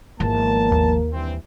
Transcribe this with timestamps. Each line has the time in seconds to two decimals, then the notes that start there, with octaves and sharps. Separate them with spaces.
0.20 G#1 E2 F3 A#3 A5
0.72 D#2
1.12 G2 E3 C4